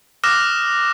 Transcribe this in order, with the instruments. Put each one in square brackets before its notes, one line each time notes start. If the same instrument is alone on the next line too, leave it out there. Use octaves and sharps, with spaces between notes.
[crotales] D6 D#6 F6 F#6 A#6 E7